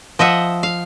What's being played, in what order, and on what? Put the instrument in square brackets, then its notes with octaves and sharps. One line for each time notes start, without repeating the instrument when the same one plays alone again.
[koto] F3 D#5 E5 F#5
F5